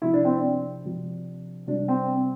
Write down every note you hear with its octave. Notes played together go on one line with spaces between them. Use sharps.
C3 F3 E4
D4
C4
D4
C3 F3
C3 G3 D4
C4